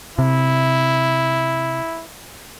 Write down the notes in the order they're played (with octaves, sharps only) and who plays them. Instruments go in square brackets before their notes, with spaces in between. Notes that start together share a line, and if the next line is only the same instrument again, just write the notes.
[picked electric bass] C3 [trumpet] E4